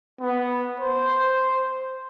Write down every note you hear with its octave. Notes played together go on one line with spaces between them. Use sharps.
B3
C5